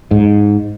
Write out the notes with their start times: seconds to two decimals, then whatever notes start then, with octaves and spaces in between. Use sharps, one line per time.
0.11 G#2